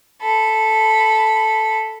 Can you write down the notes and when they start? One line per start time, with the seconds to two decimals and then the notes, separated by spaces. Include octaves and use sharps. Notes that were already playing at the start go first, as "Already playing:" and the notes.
0.22 A4 B5